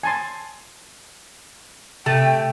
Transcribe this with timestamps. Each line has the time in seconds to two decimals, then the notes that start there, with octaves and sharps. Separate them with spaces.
0.03 G#5 A5 C6
2.06 C3 A3 G5 A5